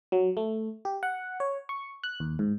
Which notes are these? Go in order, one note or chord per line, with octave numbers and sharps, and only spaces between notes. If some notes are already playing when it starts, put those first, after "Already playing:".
F#3
A3
G4
F#5
C#5
C#6
F#6
D#2
G#2